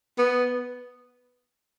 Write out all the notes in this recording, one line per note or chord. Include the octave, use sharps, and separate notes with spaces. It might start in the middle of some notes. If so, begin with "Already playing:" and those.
B3